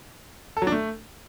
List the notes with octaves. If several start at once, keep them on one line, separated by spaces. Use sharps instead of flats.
A4
F#3
D4
A3